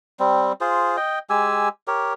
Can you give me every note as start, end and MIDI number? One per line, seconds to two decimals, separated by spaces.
0.20 0.52 55
0.20 0.52 60
0.61 0.97 65
0.61 0.97 68
0.61 0.97 72
0.97 1.19 75
0.97 1.19 79
1.30 1.69 56
1.30 1.69 67
1.30 1.69 80
1.30 1.69 88
1.87 2.14 67
1.87 2.14 70
1.87 2.14 73